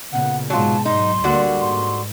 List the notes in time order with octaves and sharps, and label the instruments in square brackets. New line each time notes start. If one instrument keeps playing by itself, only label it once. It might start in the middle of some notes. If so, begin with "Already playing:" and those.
[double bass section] A#2 C#3 B3 [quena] F#5
[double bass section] G#2 B2 G#3 [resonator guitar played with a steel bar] F#3 F4 [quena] A5
[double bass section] G#2 F#3 [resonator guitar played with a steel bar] D#4 [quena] C6
[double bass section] D2 G3 A#3 [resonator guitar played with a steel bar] D3 F#4
[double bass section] G#2 [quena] C6